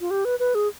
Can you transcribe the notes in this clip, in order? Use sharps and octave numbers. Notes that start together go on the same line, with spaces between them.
F4
G4
B4
B4
G#4